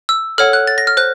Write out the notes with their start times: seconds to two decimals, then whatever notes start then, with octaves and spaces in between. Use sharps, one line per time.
0.09 E6
0.38 A4 C#5 F#5 F6
0.53 F#6
0.67 A6
0.78 A#6
0.87 F6
0.97 C5 F#6